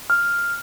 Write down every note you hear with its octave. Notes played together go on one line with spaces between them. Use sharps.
F6